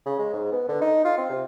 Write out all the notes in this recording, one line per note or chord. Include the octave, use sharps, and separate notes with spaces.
C#3
G#3
G#2
B3
D3
D#4
F4
C4
C3